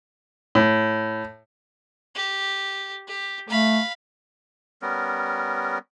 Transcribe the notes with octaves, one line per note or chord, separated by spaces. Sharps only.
A2
G4
G4
A3 F5 B5
G3 B3 C#4 A#4